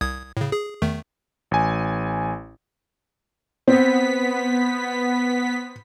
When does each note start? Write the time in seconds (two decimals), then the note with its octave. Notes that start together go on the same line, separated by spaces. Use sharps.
0.01 C2 D#6 G#6
0.37 A2 C#3
0.52 G#4
0.82 E2 D#3 A3
1.51 A1 G#5
3.68 B3 C4 B6